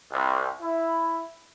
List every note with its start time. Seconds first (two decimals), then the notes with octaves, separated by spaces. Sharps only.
0.13 C2
0.61 E4